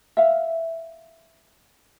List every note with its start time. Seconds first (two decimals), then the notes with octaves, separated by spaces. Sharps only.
0.17 E5 F5